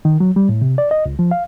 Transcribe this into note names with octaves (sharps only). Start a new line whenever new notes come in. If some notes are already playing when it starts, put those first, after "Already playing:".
D#3
F#3
G3
A2
C3
D5
D#5
C#2
F3
F5